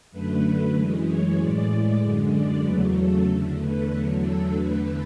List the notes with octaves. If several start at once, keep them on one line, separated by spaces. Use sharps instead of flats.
F#2 D3 A3 B4
F#2 E3 G#3
C#5
A2 E3 G#3 D5
F#2 D3 G#3
D5
E2 C#3 F#3 A3 B4
A4
E2 D3 A3
B4
E2 D3 F#3 A3 A4
A4
E2 D3 A3 B4